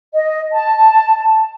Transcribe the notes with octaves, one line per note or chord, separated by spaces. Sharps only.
D#5
A5